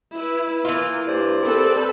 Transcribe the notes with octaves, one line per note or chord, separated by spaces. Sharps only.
E4 B4
E3 A#3 F4
G2 C5 D5
C2 C4 A4 B4